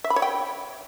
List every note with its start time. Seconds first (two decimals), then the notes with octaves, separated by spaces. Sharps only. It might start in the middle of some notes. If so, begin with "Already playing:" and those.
0.04 E5
0.10 B5
0.16 C#5
0.22 G5